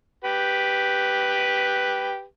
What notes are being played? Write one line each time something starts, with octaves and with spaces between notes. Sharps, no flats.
G4 B4